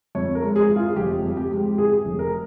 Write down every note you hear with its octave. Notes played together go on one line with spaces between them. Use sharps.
F2 C#5
A#4
G#3
G#4
E3
F4
F1 G4
F2
G4
G#3
E3 G#4
F1
A#4